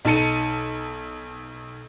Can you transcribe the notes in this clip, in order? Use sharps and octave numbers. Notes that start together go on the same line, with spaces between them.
B1 D#4 A5 C#7 D#7